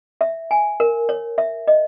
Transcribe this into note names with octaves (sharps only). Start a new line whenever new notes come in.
E5
G#5
A#4
C#5
E5
D#5